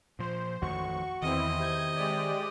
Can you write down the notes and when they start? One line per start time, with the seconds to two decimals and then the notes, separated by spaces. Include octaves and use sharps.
0.19 A#2 F3 C5
0.62 A1 F2 D#3 F#4 C#6
1.22 E2 D#3 C4 E4 D#5
1.59 C3 G6 G#6
1.96 G#3 G4 D5